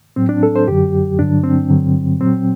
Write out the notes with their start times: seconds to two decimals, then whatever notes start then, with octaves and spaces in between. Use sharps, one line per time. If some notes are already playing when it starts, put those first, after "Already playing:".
0.16 A2 F#3 C4
0.29 D4
0.43 A4
0.56 C5
0.68 F#2 D3 F#3 G4
1.19 G2 D3 F#3 D4
1.43 C4
1.70 G2 D3 F#3
2.20 A#2 F#3 C4